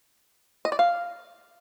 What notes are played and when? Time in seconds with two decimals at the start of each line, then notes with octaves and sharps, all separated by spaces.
0.65 D#5
0.72 D5
0.79 F5